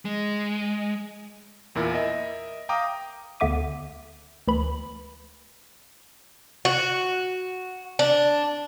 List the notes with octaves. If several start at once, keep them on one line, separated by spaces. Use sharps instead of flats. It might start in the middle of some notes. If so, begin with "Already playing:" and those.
G#3
E2 A#2 E4 A#4
A#4 D#5 E5
F5 G5 A#5 D6 D#6
D2 D3 B3 E5 D6 D#7
D2 E3 B5
F#4
D4